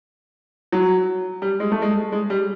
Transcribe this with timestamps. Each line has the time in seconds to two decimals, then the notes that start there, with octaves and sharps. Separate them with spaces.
0.72 F#3
1.42 G3
1.60 G#3
1.72 A3
1.82 G#3
2.12 G#3
2.30 G3